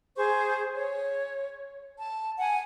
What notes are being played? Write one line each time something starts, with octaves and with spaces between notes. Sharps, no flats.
G#4 C5 C#6
C#5
A5
F#5 G#5